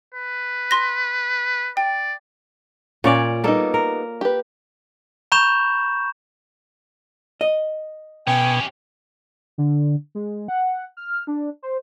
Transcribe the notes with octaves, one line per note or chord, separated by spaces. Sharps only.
B4
C6 A#6
D5 G5
A#2 C#4 F4 C#5 D5
G3 A#3 B3 D#4 A4
A#4
G4 B4
A#5 B5 C#6 G6 E7
D#5
B2 C#4 G4 G5 G#5
D3
G#3
F#5
F6
D4
C5